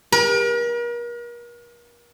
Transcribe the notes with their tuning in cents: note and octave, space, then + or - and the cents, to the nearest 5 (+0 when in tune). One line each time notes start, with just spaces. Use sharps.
A#4 +40